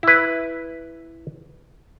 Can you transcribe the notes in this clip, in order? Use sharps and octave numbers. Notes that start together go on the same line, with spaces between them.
E4 B4